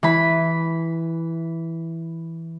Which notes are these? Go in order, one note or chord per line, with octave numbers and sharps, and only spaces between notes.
E3 B5